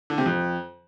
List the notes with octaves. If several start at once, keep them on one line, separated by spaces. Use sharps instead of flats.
D3
C3
F2